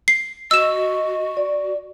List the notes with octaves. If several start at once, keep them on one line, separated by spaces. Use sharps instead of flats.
C7
F#4 D#5 E6 E7
D5